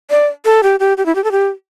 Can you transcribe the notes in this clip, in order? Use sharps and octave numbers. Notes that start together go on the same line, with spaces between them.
D5
A4
G4
G4
G4
E4
G4
A4
G4